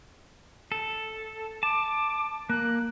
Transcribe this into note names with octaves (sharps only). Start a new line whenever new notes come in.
A4
A5 D6
A#3 F#6